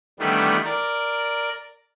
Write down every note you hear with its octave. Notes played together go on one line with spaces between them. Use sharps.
D#3 E3 G3 A3 B3 D4
A#4 D5